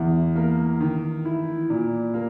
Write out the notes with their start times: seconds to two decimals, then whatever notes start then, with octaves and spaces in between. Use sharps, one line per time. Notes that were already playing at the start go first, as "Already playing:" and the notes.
Already playing: E2 E3
0.35 A#3
0.80 D#3
1.25 E4
1.70 A#2
2.14 A#3